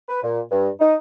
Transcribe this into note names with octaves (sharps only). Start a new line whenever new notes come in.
B4
A#2
G2
D#4